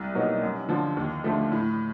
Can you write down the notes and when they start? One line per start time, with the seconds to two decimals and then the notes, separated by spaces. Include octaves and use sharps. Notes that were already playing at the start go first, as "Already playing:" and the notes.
Already playing: C2
0.14 B2 F#3 A#3 D#4
0.42 F#2
0.69 D3 F3
0.97 D#2
1.24 D3 F3 A3
1.52 A2